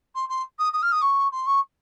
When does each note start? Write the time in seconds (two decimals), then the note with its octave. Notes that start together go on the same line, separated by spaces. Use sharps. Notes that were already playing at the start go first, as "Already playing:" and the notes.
0.15 C6
0.29 C6
0.59 D#6
0.73 D#6
0.83 F6
0.92 D#6
1.02 C#6
1.32 C6
1.47 C#6